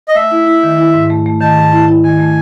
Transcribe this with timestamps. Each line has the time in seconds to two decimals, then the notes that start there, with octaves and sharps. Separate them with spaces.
0.08 D#5
0.15 A3 E5
0.31 E4
0.46 E4
0.63 D#3
0.78 E4
0.94 G#2
1.10 A3
1.26 A3
1.41 D#3 A5
1.57 G#2
1.72 E4
1.88 E4
2.04 D#3 G#5
2.20 A3